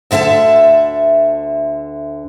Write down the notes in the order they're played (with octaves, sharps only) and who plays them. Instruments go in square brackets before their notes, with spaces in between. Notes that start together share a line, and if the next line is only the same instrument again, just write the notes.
[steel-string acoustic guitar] D2 D3 E5 F5 A5